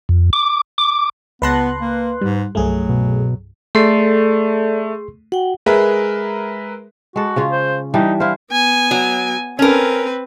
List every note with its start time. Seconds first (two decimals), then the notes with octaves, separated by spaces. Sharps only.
0.09 F2
0.33 D6
0.78 D6
1.42 C#2 B3 B4 A5 C6 F#6 A#6
1.81 A#3
2.22 G#2 G3
2.55 C2 G2 F#3 A3 G#4
2.89 B2
3.75 A3 G#4 A4 D5 C6 C7
5.32 F#4 F#5 G5
5.66 G#3 G#4 A#4 B4 E5
7.16 G#3 F#4 A4
7.36 C#3 C#4 F4
7.51 C5
7.94 E3 G3 D4 D#4
8.20 E4 C5 F5
8.52 B3 G#5
8.91 F#3
9.59 C4 C#4 A#4 B4